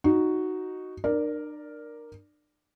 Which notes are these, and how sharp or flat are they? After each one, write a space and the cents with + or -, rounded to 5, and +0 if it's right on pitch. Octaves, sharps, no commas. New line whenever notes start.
D#4 +0 F#4 +0
D4 +45 A#4 +0 D5 +0